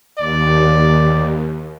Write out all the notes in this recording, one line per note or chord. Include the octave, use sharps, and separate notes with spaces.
D#2 D5